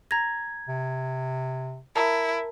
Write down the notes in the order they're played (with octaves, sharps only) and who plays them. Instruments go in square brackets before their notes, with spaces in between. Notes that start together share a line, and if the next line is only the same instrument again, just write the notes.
[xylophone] A#5 A#6 [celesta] G#6
[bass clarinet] C3
[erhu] E4 [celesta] A#4 [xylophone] A5 A#5